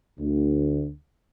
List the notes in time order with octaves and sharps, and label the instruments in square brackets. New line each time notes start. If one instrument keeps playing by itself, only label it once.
[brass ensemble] D2